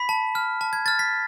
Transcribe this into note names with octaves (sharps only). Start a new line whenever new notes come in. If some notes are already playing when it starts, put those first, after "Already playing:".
Already playing: B5 B6
A5
F6
A5
G#6
F6 A6
B6